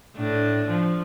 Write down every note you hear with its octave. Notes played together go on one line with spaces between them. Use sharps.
A2 D4
F3